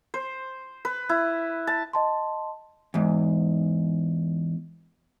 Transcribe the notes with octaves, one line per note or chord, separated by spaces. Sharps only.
C5
B4
E4
A5
D#5 A5 C6
E2 G#2